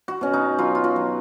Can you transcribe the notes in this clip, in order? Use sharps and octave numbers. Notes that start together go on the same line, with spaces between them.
F#4
B2 C#4
D#4
F#3 F4
F4
F#4
F#3